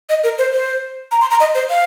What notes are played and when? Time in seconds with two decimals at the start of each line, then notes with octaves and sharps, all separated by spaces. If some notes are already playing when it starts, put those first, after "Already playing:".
0.09 D#5
0.24 A#4
0.38 C5
0.53 C5
1.11 A#5
1.21 C6
1.31 A#5
1.40 D#5
1.55 C5
1.70 F5